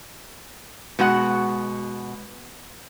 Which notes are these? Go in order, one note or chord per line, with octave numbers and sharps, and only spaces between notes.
B2 G#3 F#4 F#5